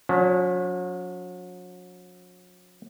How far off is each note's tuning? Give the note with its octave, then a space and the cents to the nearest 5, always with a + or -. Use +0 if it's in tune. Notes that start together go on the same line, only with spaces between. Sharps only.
F#3 -40 C#4 +35